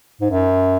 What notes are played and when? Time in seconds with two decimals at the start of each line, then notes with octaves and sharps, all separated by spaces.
0.21 G#2
0.31 F#2